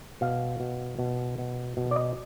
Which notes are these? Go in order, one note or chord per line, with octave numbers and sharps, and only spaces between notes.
B2 F5
B2
B2
B2
B2
D5
D#5